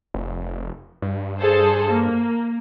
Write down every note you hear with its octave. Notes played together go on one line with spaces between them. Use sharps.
F1
G2
G#4 A4 C5
A#3